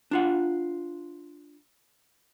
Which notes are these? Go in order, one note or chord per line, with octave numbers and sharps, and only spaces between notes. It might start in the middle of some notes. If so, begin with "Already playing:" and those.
D4 F4 F#5